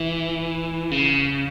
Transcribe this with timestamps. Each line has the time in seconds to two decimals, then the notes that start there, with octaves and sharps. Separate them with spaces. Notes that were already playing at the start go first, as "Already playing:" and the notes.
Already playing: E3
0.91 C#3